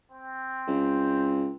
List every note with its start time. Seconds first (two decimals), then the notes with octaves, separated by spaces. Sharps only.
0.11 C4
0.67 C#2